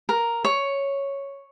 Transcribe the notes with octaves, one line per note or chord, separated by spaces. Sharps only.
A#4
C#5